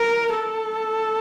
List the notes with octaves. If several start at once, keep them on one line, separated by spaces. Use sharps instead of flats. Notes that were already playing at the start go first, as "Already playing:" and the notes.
Already playing: A#4
A4